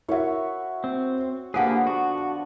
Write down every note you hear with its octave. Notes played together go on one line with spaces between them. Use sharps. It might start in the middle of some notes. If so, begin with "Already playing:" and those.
E4 F#4 A#4 C#5 E5
C4
D3 F3 A#3 B3 G4 G#4 F#5
F#4